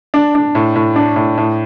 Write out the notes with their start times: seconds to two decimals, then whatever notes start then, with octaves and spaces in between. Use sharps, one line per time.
0.14 D4
0.35 D4
0.55 A2
0.76 A2
0.96 D4
1.16 A2
1.38 A2